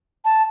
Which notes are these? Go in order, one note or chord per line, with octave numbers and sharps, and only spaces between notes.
A5